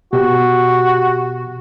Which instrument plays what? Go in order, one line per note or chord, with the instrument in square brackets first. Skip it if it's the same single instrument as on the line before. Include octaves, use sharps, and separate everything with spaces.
[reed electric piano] B2 [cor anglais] F#4 [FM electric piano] G4